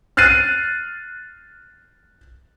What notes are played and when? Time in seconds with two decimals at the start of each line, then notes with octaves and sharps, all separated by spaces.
0.17 F6 F#6 A6 C7 D#7